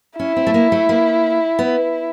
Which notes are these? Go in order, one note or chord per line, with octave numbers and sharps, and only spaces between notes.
C#4 E4
C4
A3
A#3
A3
A#3
B3